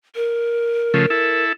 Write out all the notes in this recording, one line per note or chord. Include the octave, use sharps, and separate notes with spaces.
A#4
C#3 F3 A3
E4 A4